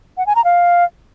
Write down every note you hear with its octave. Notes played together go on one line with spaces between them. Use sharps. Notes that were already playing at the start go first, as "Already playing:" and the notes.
F#5
G#5
A#5
F5